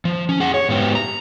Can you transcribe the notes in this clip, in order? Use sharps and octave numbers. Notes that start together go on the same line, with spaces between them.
F3
C#4
G#4 F#5
C#5
G#2 B3 G4
A#5